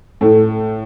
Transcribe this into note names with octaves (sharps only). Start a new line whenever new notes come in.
A2 A3